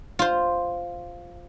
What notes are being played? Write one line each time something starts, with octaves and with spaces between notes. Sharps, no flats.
F4 C5